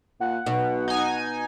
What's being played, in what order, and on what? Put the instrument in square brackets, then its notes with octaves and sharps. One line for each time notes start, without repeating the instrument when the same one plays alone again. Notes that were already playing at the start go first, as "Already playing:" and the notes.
[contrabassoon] A#2 [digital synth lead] F#5
[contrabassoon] B1 [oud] B2
[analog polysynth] D#4 G#5